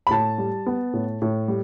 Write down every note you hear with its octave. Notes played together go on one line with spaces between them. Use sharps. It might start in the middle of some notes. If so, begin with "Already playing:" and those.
B5
A2 A5
G3
B3
A2
A2
G3